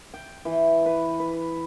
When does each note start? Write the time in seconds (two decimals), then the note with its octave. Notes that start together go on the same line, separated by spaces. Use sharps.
0.14 G5
0.45 E3
0.86 B4
1.20 B4